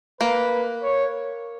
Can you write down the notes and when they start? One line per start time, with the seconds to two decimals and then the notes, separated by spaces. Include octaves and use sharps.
0.20 A#3 B4
0.83 C#5